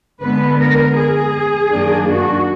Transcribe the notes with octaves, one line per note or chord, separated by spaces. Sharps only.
D3 G#3 B3 B4
A#4
G#4
F#2 D#3 A#3 D4
F#4